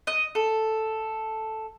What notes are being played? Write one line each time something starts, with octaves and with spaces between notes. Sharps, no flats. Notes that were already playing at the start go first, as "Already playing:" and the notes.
D#5
A4